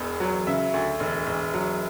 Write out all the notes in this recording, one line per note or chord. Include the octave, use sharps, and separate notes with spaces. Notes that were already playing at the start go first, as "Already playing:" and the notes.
Already playing: E1 E2
F#3
C#3 E5
D2
E1
E1
F#3